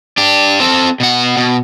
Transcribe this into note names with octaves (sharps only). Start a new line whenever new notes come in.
D4 G4
C4 A4
B2 F#5
B2